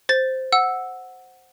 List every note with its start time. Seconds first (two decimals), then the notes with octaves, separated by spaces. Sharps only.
0.09 C5 A6
0.52 F#5 E6